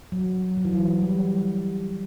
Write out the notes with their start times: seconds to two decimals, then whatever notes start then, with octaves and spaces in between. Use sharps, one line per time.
0.12 F#3
0.57 F#3
0.65 E3
0.73 F#3
1.02 G3